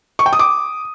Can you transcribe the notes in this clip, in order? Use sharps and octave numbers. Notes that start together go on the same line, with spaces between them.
C#6
G5
D#6
D6